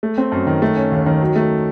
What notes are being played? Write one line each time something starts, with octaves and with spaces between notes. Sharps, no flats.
A3
C4
F#2
D#3
A3
C#4
D#2
D#3
F#3
A3